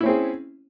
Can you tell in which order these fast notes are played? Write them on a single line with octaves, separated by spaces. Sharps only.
E4 C#4 C4 G#4